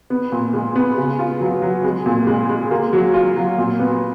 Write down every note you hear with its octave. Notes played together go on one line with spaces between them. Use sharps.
B3
A#2
G#3
B3
C#3
F4
F#3
F#3
G#3
A#2
G#3
G#3
A#3
F#3
F4
F#3
A#2
B3